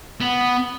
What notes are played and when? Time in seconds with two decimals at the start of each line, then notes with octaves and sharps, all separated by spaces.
0.21 B3